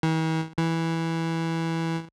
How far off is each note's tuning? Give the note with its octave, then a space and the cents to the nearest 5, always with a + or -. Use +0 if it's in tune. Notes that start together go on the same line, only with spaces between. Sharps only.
E3 -45
E3 -5